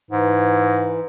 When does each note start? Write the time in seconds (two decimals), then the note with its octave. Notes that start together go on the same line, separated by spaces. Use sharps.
0.11 G#2 E3